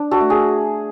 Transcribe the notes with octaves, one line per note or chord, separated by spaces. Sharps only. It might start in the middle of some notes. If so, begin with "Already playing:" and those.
Already playing: D4
F#4 A4
A3
G#4